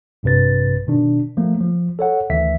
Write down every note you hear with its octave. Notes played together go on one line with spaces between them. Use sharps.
A#1 G2 C3 B4 A6
B2 D#3 D4
F3 A3 A#3
F3
A4 C#5 F#5
D2 D#3 E3 E5 B6